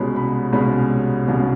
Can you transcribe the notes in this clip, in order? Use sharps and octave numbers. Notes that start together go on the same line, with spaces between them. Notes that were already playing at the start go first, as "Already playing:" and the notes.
Already playing: C2 B2 G#3 C#4 B5
B5
C2 B2 G#3 C#4 B5
C2 B2 G#3 C#4